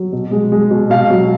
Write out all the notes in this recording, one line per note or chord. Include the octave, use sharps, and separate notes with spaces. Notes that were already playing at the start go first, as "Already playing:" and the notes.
Already playing: F#3
B2
G#3
G#3
B2
B2 F5
F#3